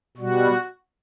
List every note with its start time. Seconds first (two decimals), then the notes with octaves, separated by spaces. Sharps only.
0.17 B2 G3 F#4